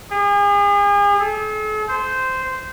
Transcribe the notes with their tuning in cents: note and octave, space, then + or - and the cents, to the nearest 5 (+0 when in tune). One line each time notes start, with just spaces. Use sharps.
G#4 -40
A4 -45
C5 -10